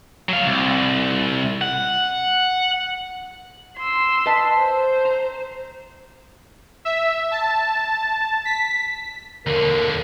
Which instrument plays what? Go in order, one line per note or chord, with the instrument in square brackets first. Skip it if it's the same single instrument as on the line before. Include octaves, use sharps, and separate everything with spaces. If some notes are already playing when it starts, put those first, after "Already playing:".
[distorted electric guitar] F#3 F5
C2
F#5
[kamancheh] C6 E6
[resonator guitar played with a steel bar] B4 D#5 A5
[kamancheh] C5
[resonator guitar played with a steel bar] A#5
[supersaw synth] E5
A5
B6
[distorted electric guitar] D#2 D3 [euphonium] A#4